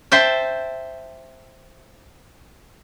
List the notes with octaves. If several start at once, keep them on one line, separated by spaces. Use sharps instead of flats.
C5 E5 G5 A5